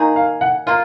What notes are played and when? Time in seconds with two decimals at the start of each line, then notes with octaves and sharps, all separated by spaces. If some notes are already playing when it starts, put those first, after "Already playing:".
Already playing: D#3 A#3 D#4 G#4
0.16 F5
0.41 F#5
0.67 A#3 F4 F5